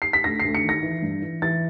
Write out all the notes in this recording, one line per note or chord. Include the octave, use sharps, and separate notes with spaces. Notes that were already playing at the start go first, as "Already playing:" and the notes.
C7
B6
D2 A#6
C7
D2
C#7
D#3 A#6
E3
G2
E3
E3 A6